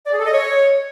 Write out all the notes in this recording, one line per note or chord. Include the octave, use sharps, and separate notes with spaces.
D5
G#4
A4
D#5
C#5